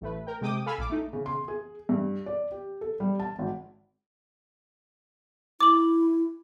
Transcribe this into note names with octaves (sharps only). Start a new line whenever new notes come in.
A1 A3 B4
A#4 G5
C3 G#3 G5 D6 D#6
A4 F5 G#5 B5 E6 F6
A#1 D6
A3 D#4
C#3
C6
G#4
G2
D5
G4
A4
G3
A5
G#1
E4 D6 F#7